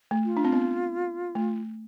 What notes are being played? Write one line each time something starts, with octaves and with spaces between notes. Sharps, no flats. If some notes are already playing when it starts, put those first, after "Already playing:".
A3
F4
D4
C4
B3
A3